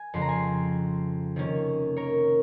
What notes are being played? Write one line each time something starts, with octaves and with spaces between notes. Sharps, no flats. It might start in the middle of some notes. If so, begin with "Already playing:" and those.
Already playing: G#5
F2 C#3 G#3 C6
A#5
G#5 C6
C3 D#3 A#3 C#4
A#4 C#5